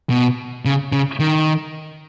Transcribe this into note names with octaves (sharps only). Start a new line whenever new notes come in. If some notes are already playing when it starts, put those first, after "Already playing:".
B2
C#3
C#3
D#3